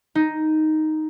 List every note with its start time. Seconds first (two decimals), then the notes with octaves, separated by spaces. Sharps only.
0.15 D#4